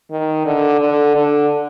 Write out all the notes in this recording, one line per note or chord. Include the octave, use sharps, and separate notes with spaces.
D#3
D3
D3
D3